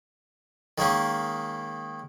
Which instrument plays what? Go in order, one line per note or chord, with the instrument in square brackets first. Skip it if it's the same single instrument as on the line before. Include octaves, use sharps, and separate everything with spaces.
[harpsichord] D#3 G#3 A#3 C#4